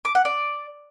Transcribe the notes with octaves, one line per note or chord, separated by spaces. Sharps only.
D6
F#5
D5